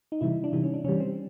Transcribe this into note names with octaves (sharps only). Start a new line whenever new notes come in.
D#4
C3 E3 G3 E4
D4
C3 E3 G3 D#4
C#4
D4
C3 E3 G3 C#4
C4